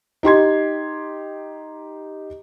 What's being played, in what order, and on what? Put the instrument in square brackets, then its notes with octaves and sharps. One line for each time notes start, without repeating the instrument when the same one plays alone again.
[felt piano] D#4 G4 C6 G#6